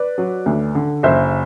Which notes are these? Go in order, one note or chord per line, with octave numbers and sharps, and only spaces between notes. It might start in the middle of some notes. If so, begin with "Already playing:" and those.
Already playing: B4 D5
F#3
D2
D3
F#1 C5 E5